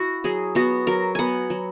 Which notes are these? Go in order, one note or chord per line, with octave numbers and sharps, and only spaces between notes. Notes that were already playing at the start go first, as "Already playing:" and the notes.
Already playing: E4 F#4
F#3 G#4
B3 F#4
F#3 A#4
B3 F#5 G#5
F#3